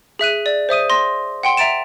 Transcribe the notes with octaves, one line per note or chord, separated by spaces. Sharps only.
G#4 E5 F#6 D#7
D5
C5 E5 D#6 D#7
C6 A#6
F#5 G5 C6
E5 A#5 A6 D7 E7